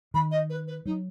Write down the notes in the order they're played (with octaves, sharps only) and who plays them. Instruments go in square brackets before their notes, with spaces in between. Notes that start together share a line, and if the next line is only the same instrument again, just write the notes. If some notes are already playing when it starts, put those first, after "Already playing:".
[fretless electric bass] D#3 [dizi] B5
[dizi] D#5
B4
B4
[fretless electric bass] F#3 [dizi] D#4